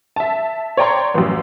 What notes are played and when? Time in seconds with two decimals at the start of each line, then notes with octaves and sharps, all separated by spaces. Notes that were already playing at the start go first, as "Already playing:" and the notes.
0.16 E5 A5
0.77 C#5 D5 G5 A#5 C6 C#6
1.14 A1 F#2